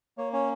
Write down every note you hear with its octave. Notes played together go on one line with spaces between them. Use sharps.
A#3 C#5
C#4 C#5